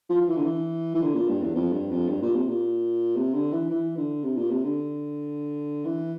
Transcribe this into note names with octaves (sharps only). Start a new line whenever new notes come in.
F3
F3
E3
D3
E3
E3
D3
A#2
G2
E2
F2
G2
F2
G2
A#2
C3
A#2
C3
D3
E3
E3
D3
C3
A#2
C3
D3
E3